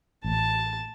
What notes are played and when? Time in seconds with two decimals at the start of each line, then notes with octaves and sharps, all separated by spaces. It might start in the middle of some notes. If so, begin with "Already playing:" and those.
0.24 A1 A5